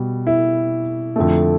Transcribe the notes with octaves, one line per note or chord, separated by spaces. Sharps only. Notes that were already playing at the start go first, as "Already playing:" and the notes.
Already playing: B2 G3
E4
F2 D3 A3